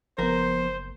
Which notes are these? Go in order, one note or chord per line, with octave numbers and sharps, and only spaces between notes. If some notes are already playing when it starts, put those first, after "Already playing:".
F#1 F3 B3 A#4 C5